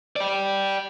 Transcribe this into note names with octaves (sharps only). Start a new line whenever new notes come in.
G4 D5